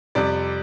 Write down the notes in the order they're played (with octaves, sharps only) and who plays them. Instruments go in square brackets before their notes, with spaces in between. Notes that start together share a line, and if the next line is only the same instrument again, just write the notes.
[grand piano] F2 C3 G3 D5